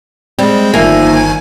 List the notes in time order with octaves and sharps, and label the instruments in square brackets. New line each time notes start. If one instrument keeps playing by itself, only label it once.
[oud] G3 [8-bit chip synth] G#3 C4
[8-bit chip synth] G1 D#3 G#5 [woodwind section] F3 D#4 [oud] A#3 [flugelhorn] E5